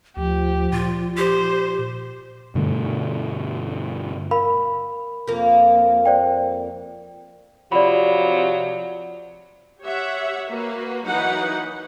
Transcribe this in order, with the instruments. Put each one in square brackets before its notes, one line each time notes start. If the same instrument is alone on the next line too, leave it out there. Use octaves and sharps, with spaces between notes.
[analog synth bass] D2 [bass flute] F3 [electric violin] G4
[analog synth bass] A#2 [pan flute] F4
[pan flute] G4 [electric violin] C5
[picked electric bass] G2 B2 D3 A3
[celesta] A#4 F5 B5
[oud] F2 A#3
[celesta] C5 D5 G5
[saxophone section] C3 F3 [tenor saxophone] F#3 [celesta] D5 B5
[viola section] G4 C#5 E5 F#5
A#3 F#4 B4
E3 F#3 A#3 D#4 B4 F#5